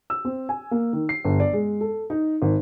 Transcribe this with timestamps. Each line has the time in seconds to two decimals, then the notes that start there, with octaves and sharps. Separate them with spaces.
0.10 E6
0.25 C4
0.49 G#5
0.71 A#3
0.93 D#3
1.09 C7
1.25 G1
1.40 D5
1.53 G#3
1.81 A4
2.10 D#4
2.42 G#1